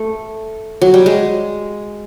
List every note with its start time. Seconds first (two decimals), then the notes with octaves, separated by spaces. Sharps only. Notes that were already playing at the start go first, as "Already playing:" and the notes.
Already playing: A3
0.82 F#3
0.94 G3
1.06 G#3